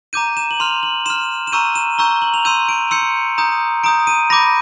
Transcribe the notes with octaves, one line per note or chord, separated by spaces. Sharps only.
A#5 D6 G6 D#7
E7
F#7
C6 F6 F7
F#7
C6 F6 E7
E7
A#5 C#6 E6 G6 D#7
E7
A#5 C#6 E6 G6 G7
F#7
F7
C6 E6 G6 D#7
D7
C6 E6 G6 C#7
A#5 D#6 G6
A#5 D#6 G6 D7
D#7
B5 D6 G6 A#6